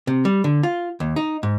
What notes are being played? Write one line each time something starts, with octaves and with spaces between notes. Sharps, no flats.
C3
G3
D3
F4
D#2
D#4
G#2